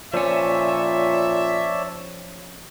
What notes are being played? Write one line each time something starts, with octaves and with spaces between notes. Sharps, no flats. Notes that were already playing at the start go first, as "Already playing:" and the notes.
A#2 F3 C#4 C#5 D5 E5 A5